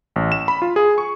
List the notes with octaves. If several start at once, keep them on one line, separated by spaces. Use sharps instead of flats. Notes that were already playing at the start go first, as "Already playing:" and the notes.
A1
E7
B5
F4
G#4
C#6